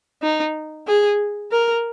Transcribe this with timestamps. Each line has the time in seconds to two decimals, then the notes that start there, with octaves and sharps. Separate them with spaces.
0.23 D#4
0.87 G#4
1.52 A#4